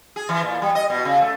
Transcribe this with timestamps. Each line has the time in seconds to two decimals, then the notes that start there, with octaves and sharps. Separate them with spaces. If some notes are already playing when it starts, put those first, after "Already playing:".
0.16 G#4
0.29 E3
0.44 A#2
0.62 G3
0.75 D#5
0.90 B2
1.05 C#3
1.22 A3